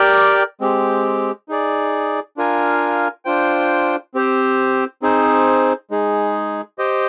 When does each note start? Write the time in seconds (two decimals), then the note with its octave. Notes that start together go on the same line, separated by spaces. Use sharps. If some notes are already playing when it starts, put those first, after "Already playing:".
Already playing: G4 A#4 D5 G5
0.61 G#3 C4 G4
1.49 D#4 G#4 D5
2.37 D4 F4 A#4 F5 G#5
3.25 D4 F4 C5 G5
4.14 C4 G4 C5
5.02 C4 D#4 G#4 C5
5.91 G#3 D#4 G#4
6.78 G4 C5 D#5 G5